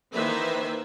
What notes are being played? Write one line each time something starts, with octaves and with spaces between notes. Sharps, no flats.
D#3 E3 A#3 B4 C5 E5